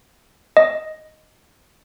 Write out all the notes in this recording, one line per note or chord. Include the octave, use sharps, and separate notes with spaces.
D#5